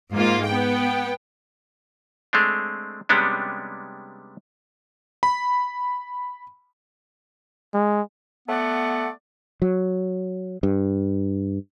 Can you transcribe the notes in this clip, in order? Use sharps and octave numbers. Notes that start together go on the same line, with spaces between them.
G#2 A#3 F4
B3 G5
G#3 A3 C4 D4
C3 G3 G#3 B3 C#4 D4
B5
G#3
A3 B3 D5 F#5
F#3
G2